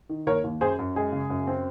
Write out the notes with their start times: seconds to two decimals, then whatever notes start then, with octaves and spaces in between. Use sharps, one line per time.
0.09 D#3
0.27 D#2 A#4 C#5
0.44 D#2
0.61 F#2 G#4 C5
0.79 F#2
0.95 G#3 G#4
1.12 C#3
1.30 F#2
1.47 C4